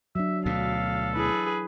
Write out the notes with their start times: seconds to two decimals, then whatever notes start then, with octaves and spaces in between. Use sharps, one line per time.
0.15 F#3 D4 E5
0.46 D2 B2 A4 F5
1.16 E4 G#4 B4